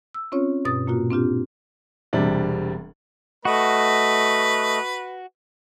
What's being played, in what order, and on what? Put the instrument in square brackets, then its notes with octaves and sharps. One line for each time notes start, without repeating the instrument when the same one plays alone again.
[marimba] E6
C4 C#4 F4 C#5
G2 B2 D#6 A6
A#2 A#3 F4 F#4
C4 D4 F4 G4
[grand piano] E1 C3 G3 D4
[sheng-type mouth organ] A3 D#5 [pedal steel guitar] F#4 [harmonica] B4